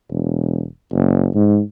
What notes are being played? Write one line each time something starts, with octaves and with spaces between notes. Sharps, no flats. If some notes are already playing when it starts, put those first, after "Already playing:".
E1
F#1
G#2